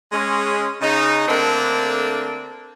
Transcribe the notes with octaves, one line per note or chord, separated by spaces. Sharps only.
G#3 C#4
C#3 D#4
D3 A3 A#3 C4 D4